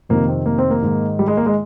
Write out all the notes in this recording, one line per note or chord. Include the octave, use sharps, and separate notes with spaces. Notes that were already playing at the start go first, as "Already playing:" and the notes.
F2 C3 D#3 A#3
C4
A#3
C4
A#3
G#2 D#3
G3
G#3
A#3
G#3